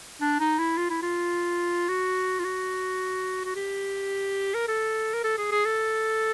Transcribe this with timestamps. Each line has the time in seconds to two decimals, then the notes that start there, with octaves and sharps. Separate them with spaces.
0.21 D4
0.40 D#4
0.59 E4
0.77 F4
0.90 E4
1.02 F4
1.89 F#4
2.39 F4
2.44 F#4
3.44 F#4
3.56 G4
4.54 A#4
4.68 A4
5.14 A#4
5.24 A4
5.38 G#4
5.52 G#4
5.65 A4